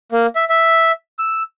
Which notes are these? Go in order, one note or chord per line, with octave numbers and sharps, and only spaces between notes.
A#3
E5
E5
E6